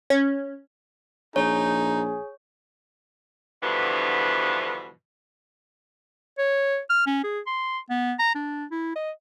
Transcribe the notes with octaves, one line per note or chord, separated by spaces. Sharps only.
C#4
A#1 D#4 G#4 C#5
G2 B2 D3 E3 F3 B3
C#5
F6
C#4
G#4
C6
B3
A#5
D4
E4
D#5